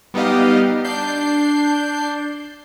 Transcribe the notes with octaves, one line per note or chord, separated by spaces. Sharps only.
G3 B3 D#4 G4 D#5 F5
D4 G6 C7